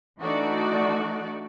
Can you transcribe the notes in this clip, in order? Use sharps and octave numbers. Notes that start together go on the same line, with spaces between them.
E3 A3 D4 D#4 F#4 D5